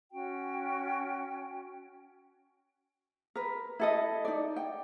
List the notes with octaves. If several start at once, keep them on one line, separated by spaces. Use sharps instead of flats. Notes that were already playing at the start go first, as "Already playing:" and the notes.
C#4 F#4 G5
A#4 B4
E4 A4 D#5
D#4 D5
G5